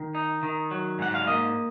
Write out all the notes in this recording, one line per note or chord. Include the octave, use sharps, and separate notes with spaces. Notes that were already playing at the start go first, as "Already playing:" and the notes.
Already playing: D#3
D#4
D#3
F#3
G#2 F#5
F5
A#3 D#5